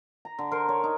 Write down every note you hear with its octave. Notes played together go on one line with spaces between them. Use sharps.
A#5
D3
A#4 C5
C#5
D#4